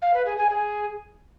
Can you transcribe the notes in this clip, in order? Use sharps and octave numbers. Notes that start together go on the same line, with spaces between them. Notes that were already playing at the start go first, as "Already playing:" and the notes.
F5
B4
G#4
G#5
G#4